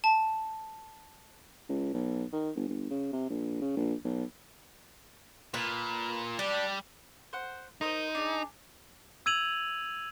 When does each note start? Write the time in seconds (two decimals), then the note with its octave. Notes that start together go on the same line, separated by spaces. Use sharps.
0.04 A5
1.69 C#2
1.93 B1
2.33 D#3
2.55 G1
2.68 G1
2.91 C#3
3.13 C3
3.30 A#1
3.61 C#3
3.77 A#1
4.05 B1
5.54 A#2 B4
6.39 G3 D4 G4
7.33 C5 F#5
7.81 D#4 A#4 C5 D#5
8.15 D4 G#4
9.26 E6 G#6 D#7 F7 F#7